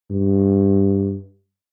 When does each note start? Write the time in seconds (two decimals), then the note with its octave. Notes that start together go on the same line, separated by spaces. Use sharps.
0.11 G2